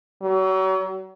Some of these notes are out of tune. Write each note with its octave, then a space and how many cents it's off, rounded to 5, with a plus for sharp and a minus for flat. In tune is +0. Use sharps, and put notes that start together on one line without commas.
F#3 +35